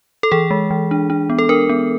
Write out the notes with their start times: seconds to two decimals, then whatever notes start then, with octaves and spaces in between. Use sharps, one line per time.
0.23 A4
0.32 E3 G#4
0.51 G#3
0.71 E3
0.91 D4
1.10 D4
1.30 B3
1.39 A4
1.49 D4 A#4
1.69 B3